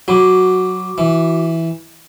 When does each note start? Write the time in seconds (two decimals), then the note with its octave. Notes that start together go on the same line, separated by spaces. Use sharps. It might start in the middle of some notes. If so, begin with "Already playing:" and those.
0.08 F#3 F#4 B5 D6
0.98 E3